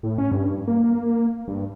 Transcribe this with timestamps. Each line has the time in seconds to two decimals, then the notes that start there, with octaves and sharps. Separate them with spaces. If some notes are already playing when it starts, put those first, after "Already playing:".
0.03 A2
0.18 C#4
0.32 G2
0.68 A#3
0.84 A#3
1.48 G2